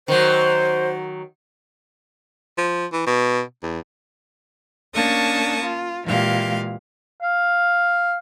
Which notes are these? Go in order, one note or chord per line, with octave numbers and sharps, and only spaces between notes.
D#3 F#3 C5
F3
E3
B2
E2
A#3 C#4 D4 A5 C#6 D#6
F4
A#2 E3 G#3 G4 F5
F5